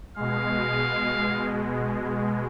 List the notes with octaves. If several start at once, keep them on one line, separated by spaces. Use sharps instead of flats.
B2 G#3 F5